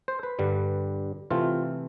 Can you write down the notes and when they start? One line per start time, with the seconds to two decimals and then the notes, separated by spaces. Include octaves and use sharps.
0.08 C5
0.23 B4
0.39 G2 D3 G3
1.31 C3 E3 A3 C4 F4